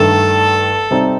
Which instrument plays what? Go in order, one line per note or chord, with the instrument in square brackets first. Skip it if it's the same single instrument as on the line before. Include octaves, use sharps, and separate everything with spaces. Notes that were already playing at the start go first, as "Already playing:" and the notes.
Already playing: [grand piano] G2 D#3 A3 [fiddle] A4
[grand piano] C3 G3 C4 D#4